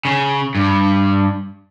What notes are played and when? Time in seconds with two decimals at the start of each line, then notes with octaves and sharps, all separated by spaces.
0.05 C#3
0.55 G2